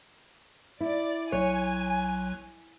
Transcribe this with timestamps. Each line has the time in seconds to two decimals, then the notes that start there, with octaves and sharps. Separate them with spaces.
0.81 E4 D5
1.32 B1 F#3 C#5 G#5 F#6